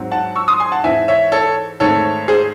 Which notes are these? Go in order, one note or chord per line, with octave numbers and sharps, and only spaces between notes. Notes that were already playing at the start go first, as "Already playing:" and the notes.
Already playing: G#2 F#3 C4
F#5 A5
C#6 E6
C6 D#6
G#5 C6
F#5 A5
G#2 E3 C4 E5 G#5
C#5 E5
A4 C#5
G#2 D#3 A3 C4 A4 C#5
G#4 C5